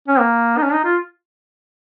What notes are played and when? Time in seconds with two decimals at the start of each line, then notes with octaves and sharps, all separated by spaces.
0.08 C#4
0.19 A#3
0.57 D#4
0.63 C#4
0.73 D#4
0.84 F4